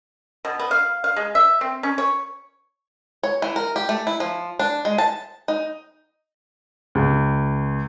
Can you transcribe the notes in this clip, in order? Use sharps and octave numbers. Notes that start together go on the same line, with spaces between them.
B2
B3
F5
F5
G#3
E5
C4
C#4
C#5
C#5
E3
A#4
G4
A3
E4
F3
D4
G#3
A5
D#4
C#2